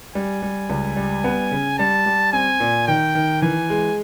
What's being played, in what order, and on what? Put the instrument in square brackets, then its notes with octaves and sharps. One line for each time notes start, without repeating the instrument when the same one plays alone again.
[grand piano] G3 [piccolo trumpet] G#5
[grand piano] G3
C#2
G3
B3
C#3
[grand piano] G3 [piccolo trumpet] A5
[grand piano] G3
[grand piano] C4 [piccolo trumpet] G#5
[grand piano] A#2
[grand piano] D#3 [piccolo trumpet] G5
[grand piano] D#3
[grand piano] E3 [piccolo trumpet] G#5
[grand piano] G#3